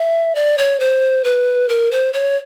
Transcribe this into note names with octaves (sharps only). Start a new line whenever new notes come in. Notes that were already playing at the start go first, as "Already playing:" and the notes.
Already playing: E5
D5
C#5
C5
B4
A#4
C5
C#5